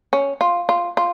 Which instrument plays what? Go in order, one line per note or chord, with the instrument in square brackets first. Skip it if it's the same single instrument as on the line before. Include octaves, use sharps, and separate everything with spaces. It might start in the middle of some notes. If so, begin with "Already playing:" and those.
[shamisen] C#4
F4
F4
F4